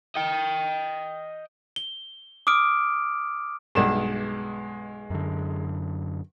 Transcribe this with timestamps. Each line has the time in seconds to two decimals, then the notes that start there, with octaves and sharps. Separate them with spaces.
0.15 D#5 G5
1.76 G7
2.47 D6 D#6 F6 D7
3.75 B1 G2 G#3 E7
5.10 F#2 D3